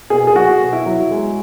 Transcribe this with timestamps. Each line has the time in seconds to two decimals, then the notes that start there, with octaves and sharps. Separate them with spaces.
0.10 B2 G#4
0.27 G#4
0.35 F#3 F#4
0.60 B2
0.73 E4
0.86 F#3
1.11 G#3